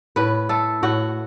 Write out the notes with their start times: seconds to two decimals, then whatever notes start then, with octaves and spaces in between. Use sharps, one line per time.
0.16 A2 B4
0.49 A3 A4
0.83 A2 F#4